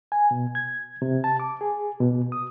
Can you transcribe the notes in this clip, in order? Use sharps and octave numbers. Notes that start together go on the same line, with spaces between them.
G#5
B2
G#6
C3
A5
D6
G#4
B2
D#6